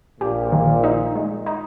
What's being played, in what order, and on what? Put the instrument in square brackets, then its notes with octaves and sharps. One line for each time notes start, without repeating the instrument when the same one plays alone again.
[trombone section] A#1 A#2 [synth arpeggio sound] G4
[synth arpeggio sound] D#3
D#4
G#3
D#4